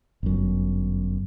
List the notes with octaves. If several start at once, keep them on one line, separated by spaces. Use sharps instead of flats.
G1 F#2